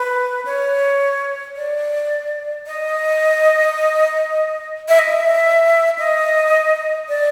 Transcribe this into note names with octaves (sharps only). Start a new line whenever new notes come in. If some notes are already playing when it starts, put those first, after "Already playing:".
Already playing: B4
C#5
D5
D#5
E5
D#5
E5
D#5
D5